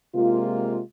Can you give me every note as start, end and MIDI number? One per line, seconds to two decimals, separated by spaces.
0.15 0.80 48
0.15 0.80 56
0.15 0.80 58
0.15 0.80 65